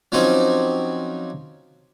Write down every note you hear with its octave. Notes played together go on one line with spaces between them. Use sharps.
F3 F#3 C4 C#4 D#4 G4